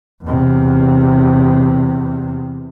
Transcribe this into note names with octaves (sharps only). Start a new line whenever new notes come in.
E2 C3